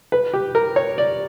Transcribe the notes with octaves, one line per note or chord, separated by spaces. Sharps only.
B4
G4
A#4
C#5
D5